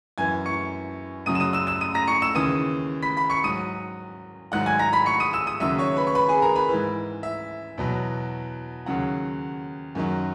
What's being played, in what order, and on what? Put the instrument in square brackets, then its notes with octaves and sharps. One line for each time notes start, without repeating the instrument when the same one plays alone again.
[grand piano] F#2 E3 G#5 G#6
C#6 C#7
F#2 C#3 F#3 D#6 D#7
E7
D#6 D#7
E6 E7
E6 E7
D#6 D#7
A#5 A#6
C#6 C#7
E6 E7
D#2 C#3 E3 D#6 D#7
B5 B6
B5 B6
C#6 C#7
G#2 F#3 D#6 D#7
G#2 D#3 F#3 F#5 F#6
G#5 G#6
A#5 A#6
B5 B6
C#6 C#7
D#6 D#7
E6 E7
D#6 D#7
D#2 C#3 F#3 E5 E6
C#5 C#6
B4 B5
C#6
B4 B5
G#4 G#5
A#4 A#5
B4 B5
G#2 E3
E5
E2 B2 F#3
D#2 C#3 F#3 F#5
F#2 D#3 F#3